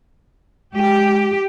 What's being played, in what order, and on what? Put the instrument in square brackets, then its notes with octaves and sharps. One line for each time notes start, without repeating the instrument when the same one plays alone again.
[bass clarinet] G#3 [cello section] G4